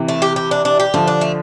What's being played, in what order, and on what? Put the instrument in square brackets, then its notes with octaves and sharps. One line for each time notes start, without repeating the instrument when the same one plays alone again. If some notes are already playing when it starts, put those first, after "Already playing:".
Already playing: [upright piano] C3 E3
[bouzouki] A3
G4
G4
D4
D4
G4
[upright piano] D3 F3 [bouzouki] A3
[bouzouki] D4
A3